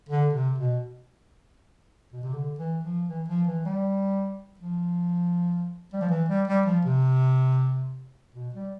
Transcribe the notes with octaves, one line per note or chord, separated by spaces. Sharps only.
D3
C3
B2
B2
C3
D3
E3
F3
E3
F3
E3
G3
F3
G3
F3
E3
G3
G3
F3
C3
B2
G3